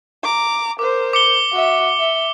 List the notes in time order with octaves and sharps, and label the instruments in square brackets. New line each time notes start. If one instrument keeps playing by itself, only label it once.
[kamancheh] A#5 D6
[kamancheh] A#4 C5 [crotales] D6
[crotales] D6 C#7 G7
[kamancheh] F#4 E5
E5